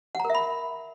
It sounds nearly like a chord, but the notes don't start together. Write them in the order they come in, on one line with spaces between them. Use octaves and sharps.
F#5 A#5 A#4 E5 B5